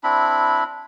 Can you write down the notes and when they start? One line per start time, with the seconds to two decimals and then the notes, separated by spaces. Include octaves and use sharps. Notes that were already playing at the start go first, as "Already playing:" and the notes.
0.03 C4 D4 E4 B5